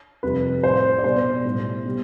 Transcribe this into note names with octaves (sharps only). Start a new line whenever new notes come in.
F2 C3 G3 B4
A2 G3 C5
D5
B2 G3 C5
A2 G3
B2 G3